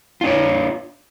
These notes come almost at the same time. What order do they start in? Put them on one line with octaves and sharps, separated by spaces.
F4 D4 C#5